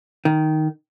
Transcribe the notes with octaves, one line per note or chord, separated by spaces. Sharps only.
D#3